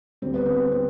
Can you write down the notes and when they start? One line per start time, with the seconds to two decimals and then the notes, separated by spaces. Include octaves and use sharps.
0.22 D2 D3 G3 C4
0.34 B3
0.46 C4
0.72 C4